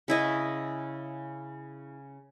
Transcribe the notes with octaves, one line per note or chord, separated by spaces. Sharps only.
C#3 E4 D#5 C#6